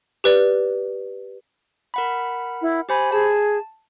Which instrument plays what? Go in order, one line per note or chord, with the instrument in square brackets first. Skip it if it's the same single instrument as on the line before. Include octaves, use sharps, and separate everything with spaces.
[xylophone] G4 B4 D5
[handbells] A#4 F#5 B5
[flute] E4
[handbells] G4 C5 B5 [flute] G#5
[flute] G#4 [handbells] A5